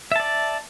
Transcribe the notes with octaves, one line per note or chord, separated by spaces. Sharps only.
D5 E5 A5